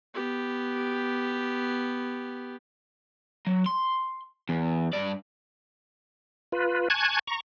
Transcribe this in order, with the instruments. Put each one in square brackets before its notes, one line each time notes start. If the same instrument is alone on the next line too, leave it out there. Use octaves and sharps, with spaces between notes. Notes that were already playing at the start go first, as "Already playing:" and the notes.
[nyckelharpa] B3 G4
[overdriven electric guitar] F#3
C6
E2
G2 D5
[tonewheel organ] F4 B4
G#5 A5 C#6 F#6 G#6
A#5 C#6